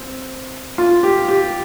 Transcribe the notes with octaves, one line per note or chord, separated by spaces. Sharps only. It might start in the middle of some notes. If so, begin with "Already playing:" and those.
Already playing: C4
F4
G4
G4